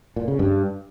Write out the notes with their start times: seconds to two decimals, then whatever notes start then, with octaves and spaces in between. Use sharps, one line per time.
0.16 A#2
0.28 C#3
0.39 G2